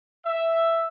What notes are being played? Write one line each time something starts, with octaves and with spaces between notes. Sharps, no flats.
E5